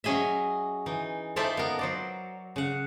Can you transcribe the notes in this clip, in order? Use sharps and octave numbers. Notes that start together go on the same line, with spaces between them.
F#3 C#4 G#4 D#5 E5
E3 D#4
D#4 F4 A4 C5 D5 E5
B3 A#4
F#3 C5 D5
C#3 F#5